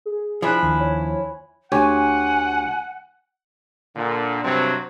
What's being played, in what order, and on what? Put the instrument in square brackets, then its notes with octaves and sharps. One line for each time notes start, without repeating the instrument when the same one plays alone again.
[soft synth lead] G#4
[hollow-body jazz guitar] F3 D4 E4 [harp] G#5 B5 F#6
[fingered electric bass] D#2
[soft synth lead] C#5
[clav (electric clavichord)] D2 G4 C#5 [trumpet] F#5 [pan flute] G#5
[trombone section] A#2 D3
G2 C3 F#3 C4